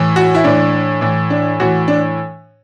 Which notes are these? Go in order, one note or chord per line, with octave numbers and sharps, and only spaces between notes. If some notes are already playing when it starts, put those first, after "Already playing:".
Already playing: A2 E3
F#4
E4
A2 E3 D4
A2 E3
D4
A2 E3 F#4
D4